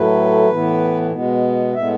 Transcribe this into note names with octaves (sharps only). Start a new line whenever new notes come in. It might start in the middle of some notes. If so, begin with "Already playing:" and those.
Already playing: A2 F#3 A3 B4
A2 E3 B3
B2 G#3 B3
A2 G#3 B3 E5